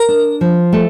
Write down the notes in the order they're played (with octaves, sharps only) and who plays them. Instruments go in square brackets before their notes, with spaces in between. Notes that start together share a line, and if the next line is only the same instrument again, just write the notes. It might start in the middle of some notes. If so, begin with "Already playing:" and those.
Already playing: [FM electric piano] A#4
[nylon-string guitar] D4
F3
A3